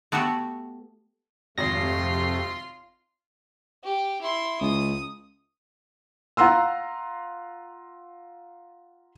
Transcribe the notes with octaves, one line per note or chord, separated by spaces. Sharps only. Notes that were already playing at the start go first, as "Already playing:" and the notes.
A3 B3 F#4 G4 E5 F#5
G#1 F2 C3 A3 F4 C6 A#6
G4
E4 C6
C#2 D#6
F4 F#5 A#5 C6 E6